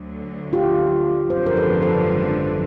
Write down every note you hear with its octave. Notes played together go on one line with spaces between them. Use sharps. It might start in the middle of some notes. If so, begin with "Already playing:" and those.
Already playing: D2 D3 F#3
F4 G4
G#1 F#2 D3 F3 C5
A#4 C5
A4 B4
A4 B4